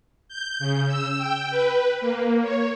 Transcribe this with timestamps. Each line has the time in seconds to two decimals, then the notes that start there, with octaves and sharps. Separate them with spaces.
0.28 G6
0.59 C#3
0.87 E6
1.18 G5
1.50 B4
2.01 A#3
2.42 C#5